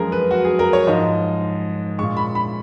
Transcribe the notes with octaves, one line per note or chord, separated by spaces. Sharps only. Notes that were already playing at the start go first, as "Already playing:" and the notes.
Already playing: F#2 F3 G#3 G#4 A#4
B4
F#4
G#4
A#4
C#5
G#2 F3 G#3 D#5
A#2 G#3 C#6
B5
B5